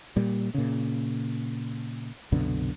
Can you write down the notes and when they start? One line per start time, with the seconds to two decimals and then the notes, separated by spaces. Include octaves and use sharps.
0.17 A#2 G3
0.54 A#2 C#3
2.32 C2 F#2 B2 D3